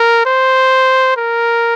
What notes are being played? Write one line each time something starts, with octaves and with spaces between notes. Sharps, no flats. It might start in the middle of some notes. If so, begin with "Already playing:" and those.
Already playing: A#4
C5
A#4